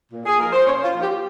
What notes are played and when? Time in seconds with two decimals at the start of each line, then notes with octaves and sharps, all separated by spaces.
0.12 A#2
0.26 G#4
0.39 F3 A#3 D#4 A#4
0.53 C5
0.66 A#2 C#4 C#5
0.84 F4
0.93 F3 A#3 D#4
1.02 G4